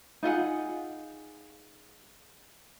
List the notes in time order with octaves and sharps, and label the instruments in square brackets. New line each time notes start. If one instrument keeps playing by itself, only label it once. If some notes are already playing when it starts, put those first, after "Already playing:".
[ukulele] D#4 F4 G#4 F#5